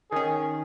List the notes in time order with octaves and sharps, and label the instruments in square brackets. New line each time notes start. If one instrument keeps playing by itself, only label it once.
[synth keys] D#3 C#4 [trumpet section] G#4